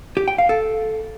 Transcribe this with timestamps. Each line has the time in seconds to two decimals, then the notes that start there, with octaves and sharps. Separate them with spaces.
0.17 G4
0.28 G5
0.38 F5
0.49 A4